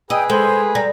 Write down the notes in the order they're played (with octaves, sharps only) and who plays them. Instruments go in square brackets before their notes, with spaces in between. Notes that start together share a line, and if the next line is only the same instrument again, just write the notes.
[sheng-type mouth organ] G#4 B4 [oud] D#5 [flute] G5 [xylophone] E6
[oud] G#3 [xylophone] A4 B5 [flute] C5
[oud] G3 [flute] A#5 [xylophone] A#6